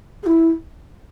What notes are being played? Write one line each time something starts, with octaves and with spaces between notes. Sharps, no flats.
G#4
E4